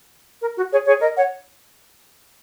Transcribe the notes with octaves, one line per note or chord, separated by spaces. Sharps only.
A#4
F#4
G#4 C#5
G#4 C#5
A#4 D#5
C#5 F#5